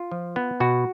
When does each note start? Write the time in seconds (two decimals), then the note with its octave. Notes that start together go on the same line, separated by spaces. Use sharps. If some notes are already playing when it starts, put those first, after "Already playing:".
Already playing: F4
0.12 F3
0.36 B3
0.60 B2 F#4